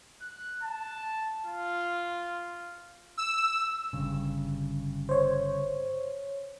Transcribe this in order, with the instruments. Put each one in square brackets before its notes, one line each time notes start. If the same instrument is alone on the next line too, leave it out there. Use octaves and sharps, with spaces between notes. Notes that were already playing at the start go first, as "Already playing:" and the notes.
[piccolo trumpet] F#6
A5
F4
[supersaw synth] E6
[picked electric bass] G1 G2 C#3
[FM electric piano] C5 C#5